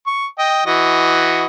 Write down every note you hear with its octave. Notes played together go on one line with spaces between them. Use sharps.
C#6
D#5 G5
E3 F#4 D#5